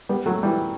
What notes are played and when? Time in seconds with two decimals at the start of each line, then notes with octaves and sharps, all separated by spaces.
0.09 G3 B3
0.26 F#3 A3
0.43 E3 G3